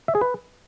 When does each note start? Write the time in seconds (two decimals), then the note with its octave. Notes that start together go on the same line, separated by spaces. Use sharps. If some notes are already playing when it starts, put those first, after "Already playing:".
0.08 E5
0.15 G#4
0.21 B4